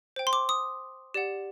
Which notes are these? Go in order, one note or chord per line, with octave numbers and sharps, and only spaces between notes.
C5 G5
C6
D6
D#6
G4 D5 F#5